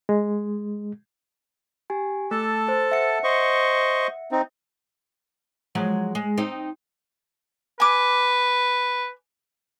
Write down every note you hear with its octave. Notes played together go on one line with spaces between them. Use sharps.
G#3
G4 G#5
A3 A4 A5 E6
C5
E5 F#5 C#7
C5 D#5 C#6
C4 D#4
F3 F#3 G#3
G#3
C4 D#4
B4 G#5 D6